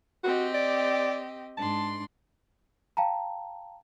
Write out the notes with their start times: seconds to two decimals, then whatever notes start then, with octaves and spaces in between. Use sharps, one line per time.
0.24 C4 F#4 G4 D#5
0.54 D5
1.58 G#2 D4 A5 C6
2.97 F5 G5 A5 A#5